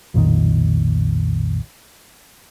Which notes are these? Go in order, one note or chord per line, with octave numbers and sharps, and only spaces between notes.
B1 F2 A#2 D#3